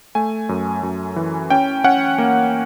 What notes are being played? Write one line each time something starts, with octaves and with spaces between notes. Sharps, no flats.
A3 G#5
F#2
F#2
E3
C#4 G5
C#4 F#5
A#3